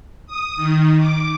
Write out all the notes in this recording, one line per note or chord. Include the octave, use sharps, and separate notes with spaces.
D#6
D#3
D6